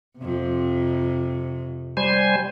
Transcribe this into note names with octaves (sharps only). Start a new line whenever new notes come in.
F2 C3
G3 C5 G#5